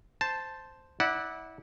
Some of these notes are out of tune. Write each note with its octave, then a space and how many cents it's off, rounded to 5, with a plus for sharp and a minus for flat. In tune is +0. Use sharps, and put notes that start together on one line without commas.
C5 +0 A5 +0
E4 -25 D5 +0 F#5 +0